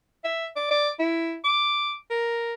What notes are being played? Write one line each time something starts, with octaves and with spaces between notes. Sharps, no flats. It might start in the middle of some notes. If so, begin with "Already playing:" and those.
E5
D5
D5
E4
D6
A#4